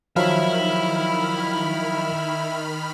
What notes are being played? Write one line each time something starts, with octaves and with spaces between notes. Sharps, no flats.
D#3 F3 F#3 E4 E5 F5 B5 F6